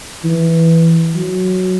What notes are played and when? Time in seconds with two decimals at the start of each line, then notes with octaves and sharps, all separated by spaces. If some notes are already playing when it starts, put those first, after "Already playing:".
0.24 E3
1.15 F#3